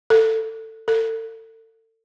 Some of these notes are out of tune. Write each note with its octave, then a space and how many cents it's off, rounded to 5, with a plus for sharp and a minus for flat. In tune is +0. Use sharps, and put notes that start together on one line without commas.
A4 +20
A4 +35